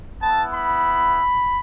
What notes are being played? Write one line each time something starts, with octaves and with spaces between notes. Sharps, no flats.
B3 E4 A5
B5